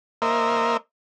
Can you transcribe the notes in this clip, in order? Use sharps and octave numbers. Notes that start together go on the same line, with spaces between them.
A#3 A#4 C5 D#5 E5